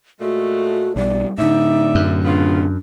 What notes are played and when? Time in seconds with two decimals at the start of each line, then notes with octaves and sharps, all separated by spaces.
0.20 A#2 G#3 A3 F#4
0.96 B1 G3 D5
1.38 A2 D3 D#4 D5 E5
1.95 F#2
2.25 C#3 B3 D4 F4